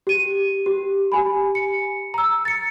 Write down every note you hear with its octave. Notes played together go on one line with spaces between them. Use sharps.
G4 D#7
G4
G4 G#5 B5
C#7
A#5 E6
A6 C#7